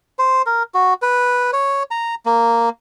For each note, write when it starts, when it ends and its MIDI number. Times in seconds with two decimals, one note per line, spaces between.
0.19 0.42 72
0.46 0.63 70
0.74 0.94 66
1.02 1.51 71
1.53 1.83 73
1.91 2.15 82
2.26 2.69 58